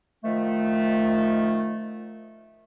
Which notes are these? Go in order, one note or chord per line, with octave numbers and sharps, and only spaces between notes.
D#3 F3 A3